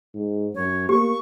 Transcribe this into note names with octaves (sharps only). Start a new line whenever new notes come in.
G#2
F#2 C#5
A#3 G4 C#6